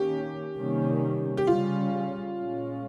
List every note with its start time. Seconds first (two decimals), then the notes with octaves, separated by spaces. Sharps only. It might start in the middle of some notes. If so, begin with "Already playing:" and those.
Already playing: D#3 A#3 C#4 G4
0.57 C3 D#3 G3 A#3 C#4
1.37 G4
1.47 C#3 G3 C#4 F4
2.37 A#2 G#3 C#4